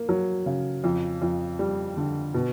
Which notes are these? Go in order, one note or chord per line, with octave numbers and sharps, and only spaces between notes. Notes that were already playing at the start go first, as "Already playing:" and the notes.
Already playing: A#3
F#3
C#3
F2
F2
G3
D3
B2